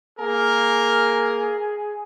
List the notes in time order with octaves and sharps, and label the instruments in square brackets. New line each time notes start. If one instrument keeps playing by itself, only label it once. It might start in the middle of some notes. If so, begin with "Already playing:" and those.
[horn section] A#3 A#4 [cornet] G#4